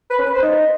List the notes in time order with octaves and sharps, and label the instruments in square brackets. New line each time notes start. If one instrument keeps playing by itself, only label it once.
[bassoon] B4
C#4
B4
C5
D#4